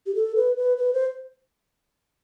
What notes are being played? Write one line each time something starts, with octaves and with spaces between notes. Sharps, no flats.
G4
A4
B4
B4
B4
C5